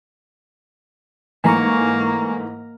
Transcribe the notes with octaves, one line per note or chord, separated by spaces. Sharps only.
G#2 E3 A3 A#3 G#5 A#5 C#6